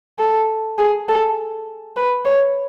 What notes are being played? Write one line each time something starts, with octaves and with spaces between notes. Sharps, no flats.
A4
G#4
A4
B4
C#5